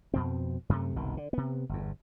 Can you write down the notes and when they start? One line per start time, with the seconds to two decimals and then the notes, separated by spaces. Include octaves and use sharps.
0.14 F2 B2 C4
0.69 F#2 C3 A3
0.96 F#1 C2 B2 D#3
1.17 D3
1.33 C3 B3
1.69 G1 E2